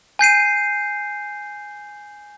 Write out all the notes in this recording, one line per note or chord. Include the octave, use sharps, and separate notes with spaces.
G#5 G6 C7 D#7